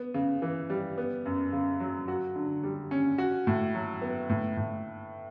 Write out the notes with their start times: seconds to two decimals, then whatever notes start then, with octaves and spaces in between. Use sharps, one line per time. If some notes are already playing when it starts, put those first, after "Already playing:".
Already playing: B3
0.14 C#3
0.42 E3
0.70 G3
0.98 B3
1.25 F#2
1.52 C#3
1.80 F#3
2.08 F#4
2.36 D3
2.63 G3
2.91 C#4
3.18 F#4
3.47 A2
3.75 F#3
4.02 B3
4.29 A2
4.57 A2